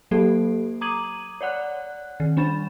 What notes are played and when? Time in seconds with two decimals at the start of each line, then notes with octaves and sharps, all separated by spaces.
0.11 F#3 A#3 G4 A4
0.81 A#5 D6 D#6 G#6 D#7 F#7
1.41 C#5 D5 F#5 F#6
2.20 D#3
2.37 G3 D4 B5 A6 E7